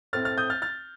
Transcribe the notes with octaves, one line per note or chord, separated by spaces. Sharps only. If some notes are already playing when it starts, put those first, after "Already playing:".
A2 A3 C4 F6 A6
F6 A6
D#6 G6
F6 A6
F6 A6